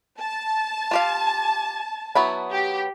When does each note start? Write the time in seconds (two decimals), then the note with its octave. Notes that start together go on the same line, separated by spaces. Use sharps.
0.19 A5
0.91 F4 G4 F5
2.15 F#3 B3 E4
2.51 G4